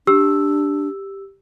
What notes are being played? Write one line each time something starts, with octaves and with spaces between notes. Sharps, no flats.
D4 G4 E6